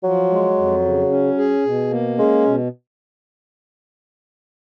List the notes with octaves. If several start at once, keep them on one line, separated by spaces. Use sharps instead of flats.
F3 F#3
G#3
F2
C#3
C#4
G#4
B2
A#3
G#3 C#4
B2